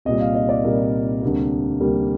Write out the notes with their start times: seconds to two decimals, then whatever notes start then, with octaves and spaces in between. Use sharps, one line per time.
0.05 C2 A#2 G3 D#5
0.20 F5
0.35 D#5
0.49 D5
0.64 C2 A#2 G3 A#4
1.22 D2 C3 G3 A#3
1.80 D2 C3 G3 A#3